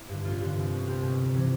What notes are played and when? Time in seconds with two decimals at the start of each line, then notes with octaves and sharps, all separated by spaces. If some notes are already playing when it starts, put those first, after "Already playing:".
Already playing: E4
0.09 G2 D3
0.25 A1 F4
0.40 G2 D3
0.56 C2
0.71 B2
0.87 C2 G4
1.03 B2
1.19 D2
1.34 C3 E3